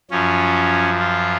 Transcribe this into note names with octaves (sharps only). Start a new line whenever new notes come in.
F#2 F3 C#4
F4